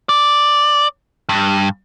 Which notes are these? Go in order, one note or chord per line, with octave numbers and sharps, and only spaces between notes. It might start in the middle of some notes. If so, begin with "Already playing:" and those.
D5
G2